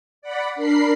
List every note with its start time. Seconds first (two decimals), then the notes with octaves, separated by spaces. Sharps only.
0.22 D5 F#5 B5
0.55 D4 A#4 B5 C7